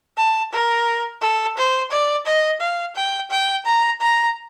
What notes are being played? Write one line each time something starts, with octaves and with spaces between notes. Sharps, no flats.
A5
A#4
A4
C5
D5
D#5
F5
G5
G5
A#5
A#5